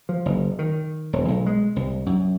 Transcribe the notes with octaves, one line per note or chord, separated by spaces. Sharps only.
F3
F#1
D#3
E1
B1
G#3
C2
F#2